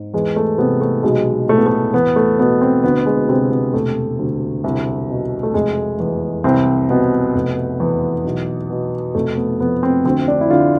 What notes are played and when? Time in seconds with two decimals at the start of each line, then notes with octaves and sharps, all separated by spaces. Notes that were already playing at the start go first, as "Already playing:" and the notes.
Already playing: G#2
0.14 E2 G#3
0.36 A3
0.58 C3 B3
0.81 A3
1.03 B1 G#3
1.48 A2 A3
1.57 B3
1.66 A3
1.94 E2 B3
2.16 A3
2.39 B2 B3
2.61 C4
2.84 D2 B3
3.06 G#3
3.29 C3 C4
3.51 B3
3.74 E1 A3
4.19 D2
4.64 C2
5.10 B2
5.43 A3
5.54 F1 G#3
6.00 E2
6.44 C2 C4
6.89 B2 B3
7.35 F1
7.80 E2
8.25 B1
8.70 B2
9.14 F1 A3
9.37 B3
9.60 F2 B3
9.83 C4
10.05 D2 C4
10.28 D4
10.41 E4
10.50 D3 F4